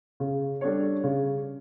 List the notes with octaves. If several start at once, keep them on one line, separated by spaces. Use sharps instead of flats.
C#3
G3 D4 A4 C#5
C#3